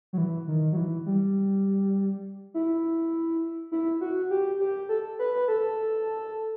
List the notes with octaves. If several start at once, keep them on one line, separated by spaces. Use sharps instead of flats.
F#3
E3
D#3
F#3
E3
G3
E4
E4
F#4
G4
G4
A4
B4
B4
A4